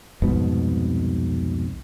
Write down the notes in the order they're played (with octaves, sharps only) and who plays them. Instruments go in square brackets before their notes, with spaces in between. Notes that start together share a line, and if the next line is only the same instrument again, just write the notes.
[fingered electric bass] C2 F2 G#2 B2